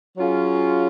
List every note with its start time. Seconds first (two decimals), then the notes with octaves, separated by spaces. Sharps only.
0.17 F#3 C#4 F4 G#4